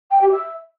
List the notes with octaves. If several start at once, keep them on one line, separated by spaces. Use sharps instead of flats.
G5
G4
E5